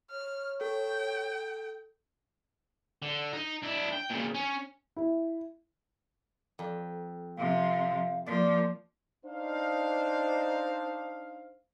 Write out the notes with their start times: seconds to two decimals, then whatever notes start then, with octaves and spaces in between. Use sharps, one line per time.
0.10 C#5 F6
0.61 A4 G5
3.02 D3
3.33 D#4
3.62 D4 E4
3.92 G5
4.10 A#2 C#3
4.34 C#4
4.97 E4
6.59 F2
7.38 C3 F3 F5
8.26 F3 A#3 D5
9.25 D4 D#4 C5 F5